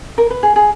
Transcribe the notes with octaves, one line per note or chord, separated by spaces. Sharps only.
A#4
B4
G#4
G#4